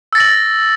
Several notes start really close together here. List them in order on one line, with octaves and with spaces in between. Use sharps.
E6 A6 A#6 F#7